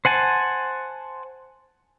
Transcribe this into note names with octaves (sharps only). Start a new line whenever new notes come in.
C5 F#5 G#5 A5